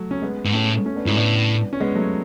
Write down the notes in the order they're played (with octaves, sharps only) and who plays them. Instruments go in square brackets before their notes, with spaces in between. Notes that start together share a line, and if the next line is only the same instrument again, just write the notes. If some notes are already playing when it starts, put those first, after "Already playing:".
Already playing: [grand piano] F#3 A3
C#4
G#3 B3
[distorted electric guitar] G#2
[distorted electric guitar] A2 [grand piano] A3 C#4
[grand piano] A3 C#4
B3 D4
[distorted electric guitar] G#2 [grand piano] C#4 E4
[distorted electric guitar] A2 [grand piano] B3 D4
[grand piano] C#4
G#3 B3
F#3 A3